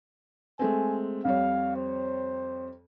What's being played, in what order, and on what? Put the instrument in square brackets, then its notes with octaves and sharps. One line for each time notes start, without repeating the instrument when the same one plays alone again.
[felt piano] G#3 A3 C4 [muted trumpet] G#5
[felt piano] F2 G3 C#5 [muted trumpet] F5
[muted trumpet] C5